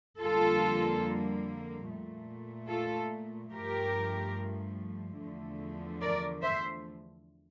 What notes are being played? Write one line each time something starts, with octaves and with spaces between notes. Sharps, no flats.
F2 D3 G3 A#3 F4 A4
A#2 A3
F4 A4
G2 F3 A3 G4 A#4
E2 D3 F3 A3
A#4 D5
C5 E5